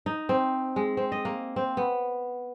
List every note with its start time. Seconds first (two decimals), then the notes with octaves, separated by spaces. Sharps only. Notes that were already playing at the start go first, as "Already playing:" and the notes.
0.06 D#4
0.29 C4
0.76 G#3
0.97 C4
1.12 D#5
1.25 A#3
1.56 C4
1.77 B3